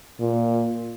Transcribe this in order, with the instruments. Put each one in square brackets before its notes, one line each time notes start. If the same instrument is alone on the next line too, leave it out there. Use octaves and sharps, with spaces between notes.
[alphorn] A#2